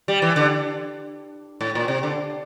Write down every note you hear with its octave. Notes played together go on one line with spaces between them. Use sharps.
G3
E3
D3
A2
A#2
C3
D3